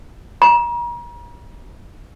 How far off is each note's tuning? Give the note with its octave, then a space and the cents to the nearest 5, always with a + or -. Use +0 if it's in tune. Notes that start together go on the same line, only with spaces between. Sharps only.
A#5 +40